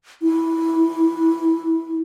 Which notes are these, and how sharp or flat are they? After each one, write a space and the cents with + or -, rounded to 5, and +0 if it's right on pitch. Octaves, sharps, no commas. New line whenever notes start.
E4 -10